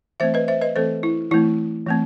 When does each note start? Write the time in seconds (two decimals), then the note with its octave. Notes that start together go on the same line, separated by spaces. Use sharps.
0.20 E3 A3 C4 C5 E5
0.34 B4 D#5
0.48 C5 E5
0.61 B4 D#5
0.76 E3 A3 C4 A4 C5
1.03 E4
1.31 E3 A3 C4 E4
1.87 E3 A3 C4